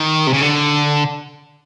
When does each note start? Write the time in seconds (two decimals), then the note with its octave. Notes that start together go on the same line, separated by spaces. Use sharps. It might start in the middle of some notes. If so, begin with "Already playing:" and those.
Already playing: D#3
0.27 C3
0.34 C#3
0.42 D3